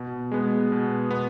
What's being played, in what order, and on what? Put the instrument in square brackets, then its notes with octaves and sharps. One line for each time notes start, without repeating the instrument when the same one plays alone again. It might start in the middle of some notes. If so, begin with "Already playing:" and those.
Already playing: [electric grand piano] B2
G#3 B3
B2
B3